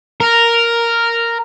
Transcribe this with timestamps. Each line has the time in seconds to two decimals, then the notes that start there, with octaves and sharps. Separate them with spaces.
0.20 A#4